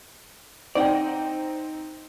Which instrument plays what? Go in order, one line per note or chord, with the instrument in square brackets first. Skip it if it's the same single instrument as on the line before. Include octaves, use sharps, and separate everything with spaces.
[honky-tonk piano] C4 D#4 [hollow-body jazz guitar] D5 F#5 G5